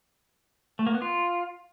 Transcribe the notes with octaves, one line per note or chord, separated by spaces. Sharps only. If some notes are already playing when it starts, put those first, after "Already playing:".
A3
A#3
B3
F4